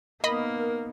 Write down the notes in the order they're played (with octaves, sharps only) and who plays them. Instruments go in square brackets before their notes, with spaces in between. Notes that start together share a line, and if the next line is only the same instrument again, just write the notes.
[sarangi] A#3 [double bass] B3 D#4 [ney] A#4 [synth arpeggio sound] D#5 B5